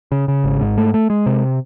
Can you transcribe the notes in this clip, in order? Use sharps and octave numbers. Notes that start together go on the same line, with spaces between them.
C#3
C#3
G#1
G#2
A3
A3
G#3
C3